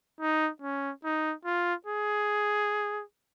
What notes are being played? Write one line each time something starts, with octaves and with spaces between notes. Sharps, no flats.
D#4
C#4
D#4
F4
G#4